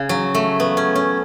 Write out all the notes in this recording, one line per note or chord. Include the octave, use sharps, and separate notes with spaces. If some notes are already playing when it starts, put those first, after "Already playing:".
Already playing: C#3
F#3
A3
B3
C#4
C#4